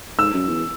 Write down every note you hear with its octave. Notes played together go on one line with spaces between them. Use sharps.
G#2 E6
F#2
E2